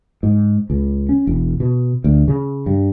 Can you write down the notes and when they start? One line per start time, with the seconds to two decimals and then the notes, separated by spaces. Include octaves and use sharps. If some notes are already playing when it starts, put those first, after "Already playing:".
0.23 G#2
0.70 C#2
1.09 C#4
1.27 E1
1.60 B2
2.04 D2
2.28 C#3
2.66 G2